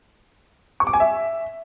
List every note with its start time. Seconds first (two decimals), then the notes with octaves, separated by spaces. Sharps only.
0.80 C#6
0.87 D6
0.93 G#5
1.00 E5